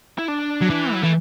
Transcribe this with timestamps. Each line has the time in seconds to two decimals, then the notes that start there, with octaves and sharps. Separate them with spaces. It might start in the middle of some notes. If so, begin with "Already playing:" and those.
0.19 E4
0.28 D4
0.61 F#3
0.70 E3
0.93 F#3
1.03 E3 A3